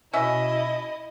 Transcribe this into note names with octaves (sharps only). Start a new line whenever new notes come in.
B2 C#4 E4 D#5 E5